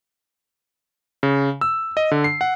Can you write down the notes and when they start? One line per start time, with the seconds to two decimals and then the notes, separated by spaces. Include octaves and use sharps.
1.23 C#3
1.61 E6
1.97 D#5
2.11 D3
2.24 C7
2.41 F#5